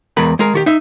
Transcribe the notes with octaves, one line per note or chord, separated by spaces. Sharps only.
E2 G#3 A#4 B5
G#3 G#4 A#4
D#3 F#4 G4
D#4 E5